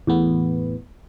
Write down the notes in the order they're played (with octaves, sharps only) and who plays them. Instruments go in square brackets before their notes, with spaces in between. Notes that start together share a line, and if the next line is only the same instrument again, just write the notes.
[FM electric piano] E2 A2 B3